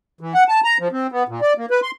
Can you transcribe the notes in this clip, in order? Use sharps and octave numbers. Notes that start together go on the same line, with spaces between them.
E3
F#5
A5
A#5
F3
C4
B3
A#2
D5
A#3
B4
C6